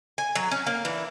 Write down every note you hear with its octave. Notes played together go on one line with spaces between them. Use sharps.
G#5
F#3
C#4
A#3
E3 D4